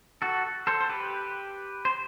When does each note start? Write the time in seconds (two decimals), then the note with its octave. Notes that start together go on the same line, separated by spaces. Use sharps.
0.22 F#4 A4
0.67 A4 C5
0.81 C5
0.89 G4 B4
1.85 C5